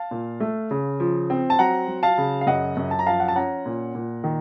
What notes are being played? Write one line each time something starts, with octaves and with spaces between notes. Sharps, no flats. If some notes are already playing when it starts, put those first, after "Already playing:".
Already playing: F5 A5
A#2
A3
C#3
F3
C4
A5
F#3 F#5 A#5
F#3
F5 A5
C#3
F5
F#2 D#5 F#5
F#2
A5
A#5
F3 F5 A5
F#5
A5
C#4 F#5 A#5
A#2
A#2
D#3